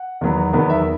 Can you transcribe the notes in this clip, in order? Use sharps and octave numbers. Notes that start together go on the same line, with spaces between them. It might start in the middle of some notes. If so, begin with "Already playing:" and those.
Already playing: F#5
E2 D#3 F#3 B3
E2 D#3 F#3 B3
E5